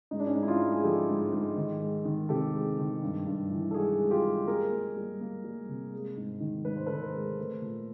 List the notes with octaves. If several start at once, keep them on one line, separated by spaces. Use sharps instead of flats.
G#2 D#4
D4
C#4 D#4
G#2
E4
D#4 F4
G#2
G#4
F3 G4 A4
G#2
G#2
D#3
G#3
D#3
C3 G4 A4
G#3
D#3
G2
G2
E3
A4
G#3 F#4 G#4
G#3
F4 G4
G#3
A#3 G#4 A#4
A#3
G3
A#3
G3
C3
G#3
G#2
D#3
G#2 B4
C5
D#3 A4 B4
A#4 C5
G#3
A3
A#2